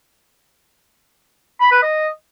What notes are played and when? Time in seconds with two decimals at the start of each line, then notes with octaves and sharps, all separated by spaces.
1.60 B5
1.72 B4
1.83 D#5